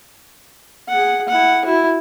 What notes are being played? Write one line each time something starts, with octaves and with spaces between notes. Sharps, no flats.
G#4 F#5
E4 F#5
E4 F#4